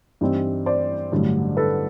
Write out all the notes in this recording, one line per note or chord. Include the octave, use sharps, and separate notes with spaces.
G2 E3 G3 C4 D#4
C5 D5
A1 G2 D3 F#3
A4 B4